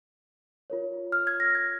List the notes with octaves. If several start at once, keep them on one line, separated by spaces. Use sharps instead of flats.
F4 A#4 C#5
F6
G#6
A#6
G#6